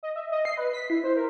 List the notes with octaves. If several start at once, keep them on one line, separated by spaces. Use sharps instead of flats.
D#5
E5
D#5
C7
B4
B6
E4
C5
A#4